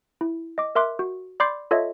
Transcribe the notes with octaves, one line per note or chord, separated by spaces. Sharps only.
E4
D#5 D6
A#4 E5 C6 D6 F#6
F#4
D5 B5 C6 D6 G6 C7
F4 A4 C#5 D#5 E5